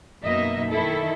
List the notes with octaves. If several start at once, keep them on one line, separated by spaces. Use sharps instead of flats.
F#2 B2 A#3 D#4 D#5 E5
D#3 E4 A4